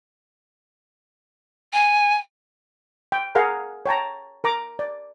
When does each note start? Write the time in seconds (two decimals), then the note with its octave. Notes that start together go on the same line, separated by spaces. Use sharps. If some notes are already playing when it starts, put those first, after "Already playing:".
1.73 G#5
3.12 G5
3.35 G#4 A#4 F5 F#5 A#5
3.86 C#5 G5 A5 A#5
4.44 A#4 A#5 D6
4.79 D5